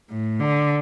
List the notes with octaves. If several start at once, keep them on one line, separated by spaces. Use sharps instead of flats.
A2
D3